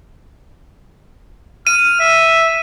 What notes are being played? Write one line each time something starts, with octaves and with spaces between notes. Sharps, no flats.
F6 D#7
E5